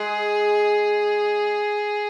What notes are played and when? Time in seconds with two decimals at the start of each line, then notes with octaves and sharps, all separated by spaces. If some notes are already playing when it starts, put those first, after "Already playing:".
Already playing: G#3 G#4